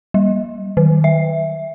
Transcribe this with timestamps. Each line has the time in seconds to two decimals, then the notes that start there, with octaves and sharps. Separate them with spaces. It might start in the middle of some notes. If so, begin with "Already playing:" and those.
0.14 G3
0.77 D#3
1.04 E5